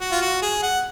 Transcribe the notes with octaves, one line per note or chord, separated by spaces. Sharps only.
F#4
F4
F#4
G#4
F#5